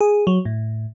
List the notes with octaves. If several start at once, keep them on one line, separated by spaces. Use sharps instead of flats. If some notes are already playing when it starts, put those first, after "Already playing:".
G#4
F#3
A2